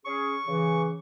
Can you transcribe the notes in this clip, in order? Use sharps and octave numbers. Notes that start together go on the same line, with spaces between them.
C#4 G#4 C#6
C#3 E3